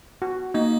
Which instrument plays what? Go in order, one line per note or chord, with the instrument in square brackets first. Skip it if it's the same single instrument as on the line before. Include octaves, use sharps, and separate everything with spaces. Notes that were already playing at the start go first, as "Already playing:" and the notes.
[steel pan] F#4
[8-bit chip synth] A#3 [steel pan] D#4